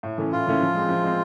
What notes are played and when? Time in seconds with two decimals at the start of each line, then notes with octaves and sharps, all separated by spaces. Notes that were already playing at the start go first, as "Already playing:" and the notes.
0.03 A2
0.18 E3 A3 C#4
0.32 A2 F4
0.47 E3 A3 C#4
0.61 F3
0.75 G#3 C4
0.89 F3
1.03 G#3 C4